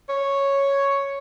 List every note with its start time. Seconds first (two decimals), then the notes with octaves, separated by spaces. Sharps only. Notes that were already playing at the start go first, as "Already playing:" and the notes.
0.09 C#5